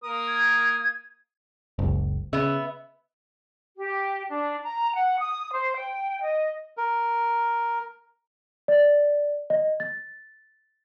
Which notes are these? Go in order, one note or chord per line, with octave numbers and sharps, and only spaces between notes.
A#3 A#4 D#6
G#6
F#1 C#2
C#3 B3 E5
G4
D4
A#5
F#5
D#6
C5
G5
D#5
A#4
D5
D#5
A6